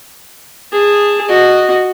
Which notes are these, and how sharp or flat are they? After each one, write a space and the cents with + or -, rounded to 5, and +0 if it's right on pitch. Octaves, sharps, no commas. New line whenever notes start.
G#4 -15 A5 +0
F#4 +0 D#5 -10